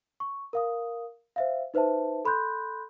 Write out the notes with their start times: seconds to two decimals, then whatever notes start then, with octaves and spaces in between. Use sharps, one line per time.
0.20 C#6
0.53 A#4 F5 D#6
1.36 C5 E5 F5
1.74 D#4 B4 C5 E5 A5
2.25 A4 B5 C6 F#6 G6